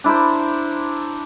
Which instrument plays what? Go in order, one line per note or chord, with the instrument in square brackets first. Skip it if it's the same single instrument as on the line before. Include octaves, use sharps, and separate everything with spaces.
[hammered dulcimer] D4 E4 A#4 C5